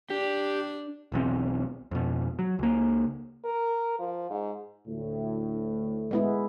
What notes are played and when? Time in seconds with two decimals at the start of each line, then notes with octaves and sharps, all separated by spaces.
0.10 D4 G4
1.12 E1 B1 E2 C4
1.91 F2 B2
2.39 F#3
2.59 C#2 A#3
3.44 A#4
3.99 F3
4.30 G#2
4.87 D2 A2
6.11 G#3 B3 E4